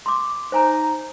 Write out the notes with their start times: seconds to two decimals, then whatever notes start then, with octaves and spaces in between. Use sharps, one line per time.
0.06 C6 D6
0.52 D#4 C5 G#5 A#5